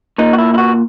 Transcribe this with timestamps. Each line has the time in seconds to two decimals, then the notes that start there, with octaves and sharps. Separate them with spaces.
0.18 A#2 D#4
0.33 F#4
0.38 E4
0.54 E4
0.58 F#4